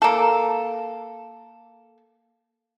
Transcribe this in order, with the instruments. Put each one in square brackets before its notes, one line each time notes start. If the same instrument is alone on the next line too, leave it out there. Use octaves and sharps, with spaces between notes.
[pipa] A#3 A4